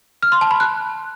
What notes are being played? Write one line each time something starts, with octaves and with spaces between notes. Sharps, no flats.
F6
C6
A5
B5
F#6